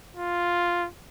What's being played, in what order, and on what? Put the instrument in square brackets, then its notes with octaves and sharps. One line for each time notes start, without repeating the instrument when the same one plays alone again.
[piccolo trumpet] F4